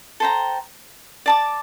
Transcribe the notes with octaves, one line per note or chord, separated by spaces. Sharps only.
A4 C5 G5 A#5
D5 A5 D6